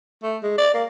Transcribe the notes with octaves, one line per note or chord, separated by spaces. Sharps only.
A3
G#3
D5
A#3